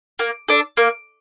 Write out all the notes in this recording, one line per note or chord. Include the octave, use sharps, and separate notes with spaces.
A#3
D4 A4
A#3